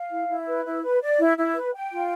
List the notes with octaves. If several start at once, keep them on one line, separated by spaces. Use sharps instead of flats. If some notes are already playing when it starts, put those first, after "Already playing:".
Already playing: F5
E4
E4
B4
E4
B4
D5
E4
E4
B4
G5
F4